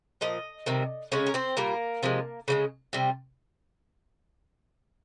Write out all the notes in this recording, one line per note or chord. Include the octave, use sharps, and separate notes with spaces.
A#2 F3 D#5
C3 D#3 G3
C#3 G#3 C#4 C#5
A#4
C4 C5
A#2 G3 A#3 A#4
C3 F3 G#3
C#3 F3 G#3
C3 G3